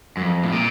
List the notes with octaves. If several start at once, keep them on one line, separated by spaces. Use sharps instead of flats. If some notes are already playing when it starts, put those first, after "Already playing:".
F#2
F2
A2
A#2